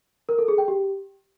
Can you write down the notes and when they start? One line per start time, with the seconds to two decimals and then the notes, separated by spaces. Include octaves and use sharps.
0.29 A#4
0.38 A4
0.48 G#4
0.58 G5
0.68 G4